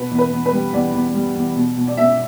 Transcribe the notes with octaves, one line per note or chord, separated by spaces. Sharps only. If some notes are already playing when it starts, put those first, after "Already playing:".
Already playing: B2 B4
E2
B4
E2
B4
G3
E2 D5
E2
G3
E2
B2
B2
D5
B2 E5